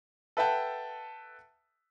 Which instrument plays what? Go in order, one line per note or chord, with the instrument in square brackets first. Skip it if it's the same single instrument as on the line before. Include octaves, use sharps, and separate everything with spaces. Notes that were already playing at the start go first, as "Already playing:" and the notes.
[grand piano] A4 B4 E5 F#5 G5 A5